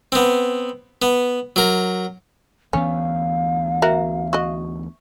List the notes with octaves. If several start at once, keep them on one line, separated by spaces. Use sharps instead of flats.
B3 C4
B3
F#3 A#4
D2 E3 B3 C#4 F5
F#4 A#4 E5
F#4 D#5 C#6